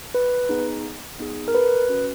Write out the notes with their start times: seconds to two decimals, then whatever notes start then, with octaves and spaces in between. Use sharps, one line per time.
0.15 B4
0.49 B3 D#4 G#4
1.19 B3 D#4 G#4
1.48 A#4
1.55 B4
1.89 C#4 F#4